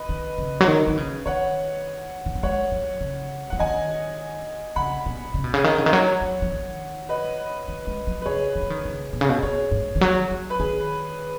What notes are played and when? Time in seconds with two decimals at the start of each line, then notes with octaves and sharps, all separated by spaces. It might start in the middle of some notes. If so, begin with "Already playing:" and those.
Already playing: B4 D#5
0.09 D#3
0.38 C#3
0.61 F#3
0.68 D#3
0.88 D#3
0.98 C#3
1.26 D#3 C#5 F#5
2.26 D#3
2.35 F#3
2.43 G#3 C#5 F#5
2.72 F#3
3.01 C#3
3.50 F#3 F#5
3.59 D#3 D#5 G#5
4.76 C#3 F#5 B5
5.06 B2
5.34 C#3
5.44 B2
5.54 C#3
5.64 D#3
5.78 C#3
5.86 D#3
5.93 F#3 C#5 F#5
6.21 F#3
6.42 F#3
6.52 D#3
7.09 B4 D#5
7.68 D#3
7.87 G#3
8.07 F#3
8.22 B4
8.26 C#3 G#4 C#5
8.55 D#3
8.62 F#3
8.70 D#3
8.85 C#3
9.13 B2
9.21 C#3
9.29 B2
9.43 B2 G#4 C#5
9.71 G#2
9.96 D#3
10.01 F#3
10.31 F#3
10.50 B4
10.59 D#3 G#4